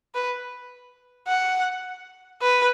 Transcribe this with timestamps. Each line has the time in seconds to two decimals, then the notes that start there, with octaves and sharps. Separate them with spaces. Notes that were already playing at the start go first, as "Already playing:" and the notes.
0.15 B4
1.28 F#5
2.42 B4